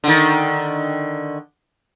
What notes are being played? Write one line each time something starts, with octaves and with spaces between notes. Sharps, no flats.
D3 D#3